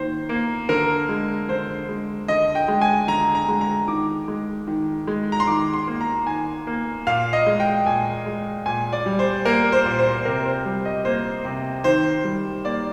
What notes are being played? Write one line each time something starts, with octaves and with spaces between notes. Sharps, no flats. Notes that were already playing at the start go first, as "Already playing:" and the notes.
Already playing: D#3 A#3 C5
A#3
D3 A#4
G#3
D3 C5
G#3
D3 D#5
G5
G#3
G#5
D3 A#5
A#5
G#3
A#5
D#3 D6
G#3
D#3
G#3
A#5
C6
D#3 D6
C6
A#3
A#5
D#3 G#5
A#3
A#2 F5
D#5
G#3
G5
A#2 G#5
G#3
A#2 G#5
D5
G3
C5
A#3 A#4
C5
A#2
C5
C3 A#4
C5
G3
D#5
A#3 C5
C3
D#3 C5
G3
A#3 D5